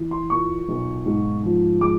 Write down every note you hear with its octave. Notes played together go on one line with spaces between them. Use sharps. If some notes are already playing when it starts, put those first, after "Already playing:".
Already playing: E3
C6
A#2 C#6
B1
G#2
F3
G#3 D6